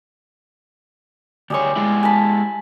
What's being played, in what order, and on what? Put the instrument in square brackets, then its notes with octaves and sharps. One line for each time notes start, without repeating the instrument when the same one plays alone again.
[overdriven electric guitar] D2 C#5 [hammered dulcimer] G3 G#4 C6
[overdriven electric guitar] G#3 E4
[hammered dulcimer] G#5 A5 B5